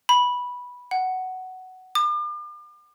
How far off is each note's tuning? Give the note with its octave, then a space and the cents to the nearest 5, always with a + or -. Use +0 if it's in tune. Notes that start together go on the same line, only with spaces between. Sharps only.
B5 -10
F#5 +10
D6 +40